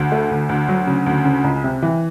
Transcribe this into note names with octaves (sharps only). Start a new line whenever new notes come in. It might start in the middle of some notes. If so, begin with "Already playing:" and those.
Already playing: D2
A3
D2
D2
F#3
C#3
D2
C#3
C#2
C3
E3